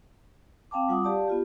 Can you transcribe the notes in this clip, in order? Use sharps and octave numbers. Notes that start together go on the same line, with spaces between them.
C4 F5 G5 A5 D6
G3 F4 F#5 D6 D#6
G4 D5 F5 A5
B3 F4 G4